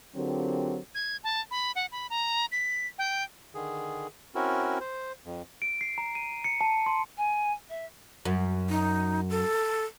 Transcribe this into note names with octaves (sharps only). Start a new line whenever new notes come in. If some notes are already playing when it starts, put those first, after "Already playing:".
D3 F#3 C4 F4 G4 A#4
G#6
A5
B5
F#5
B5
A#5
B6
G5
D3 D#3 G#4
C4 C#4 E4 F#4 A#4
C5
F2
D7
C7
A#5
D#7
C#7
A5
C6
G#5
E5
F#2
D#4
A4